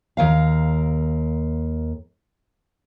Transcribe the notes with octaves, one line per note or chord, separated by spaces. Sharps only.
D#2 A#4 F5